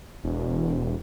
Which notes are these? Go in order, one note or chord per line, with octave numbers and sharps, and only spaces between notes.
E1